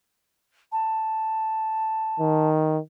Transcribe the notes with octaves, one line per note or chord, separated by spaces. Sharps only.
A5
D#3